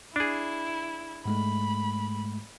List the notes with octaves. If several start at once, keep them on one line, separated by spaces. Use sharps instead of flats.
D4 E4 G#4
G#2 G#3 A3 B5